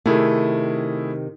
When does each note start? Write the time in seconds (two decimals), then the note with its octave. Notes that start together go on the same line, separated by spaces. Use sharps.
0.06 C3 D#3 A3 E4 G#4